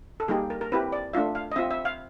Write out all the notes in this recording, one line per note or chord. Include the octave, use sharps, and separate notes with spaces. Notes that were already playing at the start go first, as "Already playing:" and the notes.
A4
G3 A#3 D#4 G4 G#4
A#4
A#4
C4 E4 G4 B4
D5
A3 D4 F4 E5
F5
D#5
C4 F4 E5
E5
F5